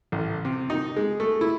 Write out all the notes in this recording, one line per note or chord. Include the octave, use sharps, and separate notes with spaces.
A1
C3
D#4
G#3
A3
E4